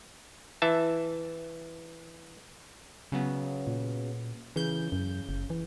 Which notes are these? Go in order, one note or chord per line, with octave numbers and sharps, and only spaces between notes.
E3 E5 A5
C#3 F#3 B3
A#2
C#3 E3 G6
F#2
F#1
E3